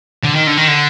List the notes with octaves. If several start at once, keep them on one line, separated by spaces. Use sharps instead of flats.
D3
D#3
D3
D#3
D3